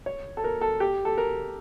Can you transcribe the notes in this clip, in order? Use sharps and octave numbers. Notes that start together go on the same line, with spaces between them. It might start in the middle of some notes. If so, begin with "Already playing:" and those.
C#5
A4
A#4
A4
G4
A4
A#4